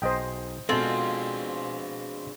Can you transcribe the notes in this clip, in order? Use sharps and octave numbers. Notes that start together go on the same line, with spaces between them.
B1 G#4 C5 D#5 G5 A#5
B2 G#3 B3 C4 D4 F4 G#4 A4